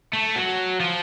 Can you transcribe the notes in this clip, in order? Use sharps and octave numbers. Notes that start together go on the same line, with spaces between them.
A3
F#3
F3